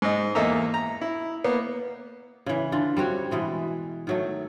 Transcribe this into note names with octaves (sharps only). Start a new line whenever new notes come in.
G#2 D#5
E2 A#3 A4 D#5 E5 A#5
A#5
E4
A#3 B3
C#3 E3
D3 F4
G3 C4 F#4 C#5
B2 E3 G#3
D#3 F#3 A3